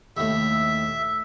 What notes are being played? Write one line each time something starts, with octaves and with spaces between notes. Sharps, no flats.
D#2 A2 E5